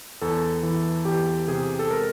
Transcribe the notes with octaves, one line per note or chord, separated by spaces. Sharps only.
E2 A4
E3
E2 G4
C3 G#4
A4
G#3 A#4